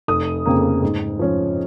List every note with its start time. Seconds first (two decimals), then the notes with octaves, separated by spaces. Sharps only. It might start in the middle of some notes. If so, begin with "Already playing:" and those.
0.08 F1 D#6
0.46 F2 C#3 A#3
0.82 G#2
1.19 F3 C#4